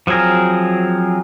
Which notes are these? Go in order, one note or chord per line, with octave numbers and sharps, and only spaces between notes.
F3 F#3 C4 G#4 A#4